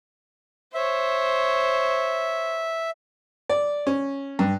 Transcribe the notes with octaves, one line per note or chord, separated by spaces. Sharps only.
C5 C#5 E5
D5
C#4
G2